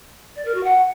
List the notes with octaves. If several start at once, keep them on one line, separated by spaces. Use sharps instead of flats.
D5
A#4
F#4
F#5